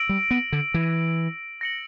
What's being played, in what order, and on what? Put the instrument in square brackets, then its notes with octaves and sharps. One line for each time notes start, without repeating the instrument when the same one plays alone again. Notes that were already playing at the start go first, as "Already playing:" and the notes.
Already playing: [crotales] E6 A#6 D7 F#7
[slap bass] G3
B3
D3
E3
[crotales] A#6 C#7 F#7